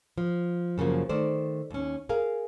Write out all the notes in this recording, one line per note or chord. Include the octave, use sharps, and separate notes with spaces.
F3
F#2 C#3 F3 A#3
D#3 A3 C5 D5
D#2 C#4
G#4 A#4 F5